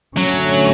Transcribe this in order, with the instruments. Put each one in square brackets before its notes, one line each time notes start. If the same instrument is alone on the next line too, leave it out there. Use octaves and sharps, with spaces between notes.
[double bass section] D3 A3 C#4 [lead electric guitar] F#3